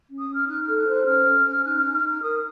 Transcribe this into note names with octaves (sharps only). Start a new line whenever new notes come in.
C#4
D#6
C#4 F6
D#4 F#6
F6
A4
F#6
C5
F#6
C#4 F6
C#4
C#4
D#4 F#6
D#4 F6
F6
D#4
F6
A#4 D#6